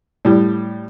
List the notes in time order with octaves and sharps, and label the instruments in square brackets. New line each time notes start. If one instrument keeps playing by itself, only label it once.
[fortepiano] A2 G3